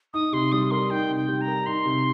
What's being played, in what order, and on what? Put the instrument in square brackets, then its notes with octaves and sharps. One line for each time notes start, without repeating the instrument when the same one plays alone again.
[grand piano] D#4 [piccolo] D#6
[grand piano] C3 [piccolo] C6
[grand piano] G3 [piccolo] D#6
[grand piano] A#4 [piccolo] C6
[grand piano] D#4 [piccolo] G5
[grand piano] C3
[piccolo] G5
[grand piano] G3
[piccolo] A#5
[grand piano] A#4
[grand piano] D#4 [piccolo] C6
[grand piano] C3